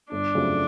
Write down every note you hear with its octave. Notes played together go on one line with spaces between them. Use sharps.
G1 D4
F2 C#3 F#3 A3